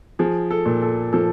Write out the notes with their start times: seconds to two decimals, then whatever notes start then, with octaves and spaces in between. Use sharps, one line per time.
0.19 F3 G#4
0.51 A4
0.66 A#2
0.82 A4
1.13 F3 A4